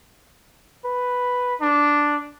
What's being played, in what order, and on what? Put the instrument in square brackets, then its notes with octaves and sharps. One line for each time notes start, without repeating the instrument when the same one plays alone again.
[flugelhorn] B4
D4